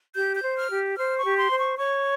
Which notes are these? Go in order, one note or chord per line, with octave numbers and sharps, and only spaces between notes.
G4 G6
G6
C5
F6
G4
C5 F6
C#6
G4
C6
C5
C#6
C#5 C#6